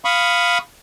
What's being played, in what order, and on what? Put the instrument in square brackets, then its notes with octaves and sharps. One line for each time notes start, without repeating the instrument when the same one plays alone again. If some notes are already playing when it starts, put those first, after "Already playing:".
[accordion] F5 B5 C#6 D#6